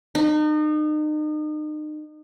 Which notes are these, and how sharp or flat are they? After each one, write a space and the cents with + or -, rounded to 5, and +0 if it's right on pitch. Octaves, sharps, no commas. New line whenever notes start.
D#4 -35